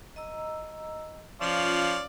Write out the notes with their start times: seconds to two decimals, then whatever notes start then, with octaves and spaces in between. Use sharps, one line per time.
0.16 D#5 A#5 E6
1.41 F3 C#4 F4 C#5 D5 F5